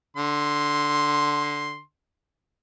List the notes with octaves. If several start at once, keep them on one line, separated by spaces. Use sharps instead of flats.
D3 C6